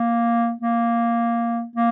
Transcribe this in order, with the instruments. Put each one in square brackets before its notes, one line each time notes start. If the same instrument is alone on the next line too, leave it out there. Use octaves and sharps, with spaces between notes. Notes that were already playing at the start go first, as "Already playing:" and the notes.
Already playing: [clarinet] A#3
A#3
A#3